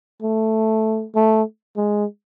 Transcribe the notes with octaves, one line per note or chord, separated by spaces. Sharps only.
A3
A3
G#3